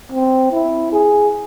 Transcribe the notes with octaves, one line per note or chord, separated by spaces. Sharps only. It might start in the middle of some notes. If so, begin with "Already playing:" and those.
C4
E4
G#4